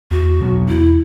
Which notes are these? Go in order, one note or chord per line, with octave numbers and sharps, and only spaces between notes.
E2 F#4
B2 F#3 B3
E2 E4